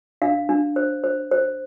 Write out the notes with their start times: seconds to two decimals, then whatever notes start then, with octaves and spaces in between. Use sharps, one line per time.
0.22 D4 F5
0.49 D4
0.76 C5
1.04 C5
1.31 C5